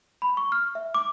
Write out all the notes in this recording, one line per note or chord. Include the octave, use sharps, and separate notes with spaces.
B5
C#6
F6
E5
D6